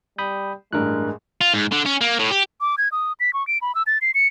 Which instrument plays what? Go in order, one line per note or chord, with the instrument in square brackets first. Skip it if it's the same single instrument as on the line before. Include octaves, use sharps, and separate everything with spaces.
[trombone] G3 [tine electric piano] B5 D#6 G6
[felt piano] A1 G2 [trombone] G#3 [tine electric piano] A#4 F#6
[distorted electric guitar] F4
G#2
D3
C#4
A#3
A2
G4
[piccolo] D6
G#6
D#6
B6
C#6
D7
B5
E6
A6
C7
C#7